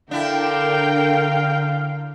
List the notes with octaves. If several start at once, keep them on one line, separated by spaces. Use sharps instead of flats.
D3 D4 E4 A#4 F5 G5